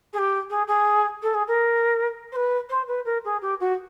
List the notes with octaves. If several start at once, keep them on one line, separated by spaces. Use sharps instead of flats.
G#4
G4
G#4
G#4
A4
G#4
A#4
C5
B4
C5
B4
A#4
G#4
G4
F#4